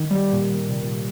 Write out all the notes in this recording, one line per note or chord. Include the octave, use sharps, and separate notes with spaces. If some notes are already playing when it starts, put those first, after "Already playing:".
Already playing: D#3
G3
A#2
A#2
C3
A#2